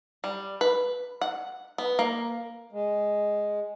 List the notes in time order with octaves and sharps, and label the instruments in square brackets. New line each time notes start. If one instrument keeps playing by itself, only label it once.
[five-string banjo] G3
B4
F#5
B3
A#3
[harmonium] G#3